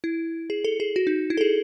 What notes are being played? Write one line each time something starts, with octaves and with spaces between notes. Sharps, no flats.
E4
G#4
A4
G#4
F#4
D#4
E4
A4
G#4